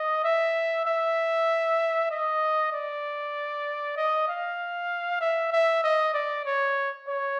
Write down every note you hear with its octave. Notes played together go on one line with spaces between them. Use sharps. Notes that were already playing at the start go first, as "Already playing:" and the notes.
Already playing: D#5
E5
E5
D#5
D5
D#5
F5
E5
E5
D#5
D5
C#5
C#5